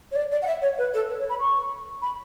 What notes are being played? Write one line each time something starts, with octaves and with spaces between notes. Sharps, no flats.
C#5
D5
D5
F#5
E5
C#5
B4
A4
B4
C#5
B5
C#6
B5